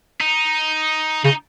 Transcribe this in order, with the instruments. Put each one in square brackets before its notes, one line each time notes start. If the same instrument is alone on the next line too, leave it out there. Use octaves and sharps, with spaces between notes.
[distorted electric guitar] D#4
[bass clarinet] C#3 [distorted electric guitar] D#4